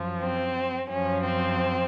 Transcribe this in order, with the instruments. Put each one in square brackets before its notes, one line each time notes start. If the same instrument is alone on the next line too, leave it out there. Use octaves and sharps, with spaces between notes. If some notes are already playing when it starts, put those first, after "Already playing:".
Already playing: [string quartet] F#2 F3
C4
F#2 F3 C#4
C4